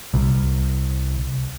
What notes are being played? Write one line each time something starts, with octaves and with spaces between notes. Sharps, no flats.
C2